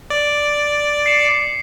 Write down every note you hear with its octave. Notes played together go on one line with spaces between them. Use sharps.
D5
C7 C#7 E7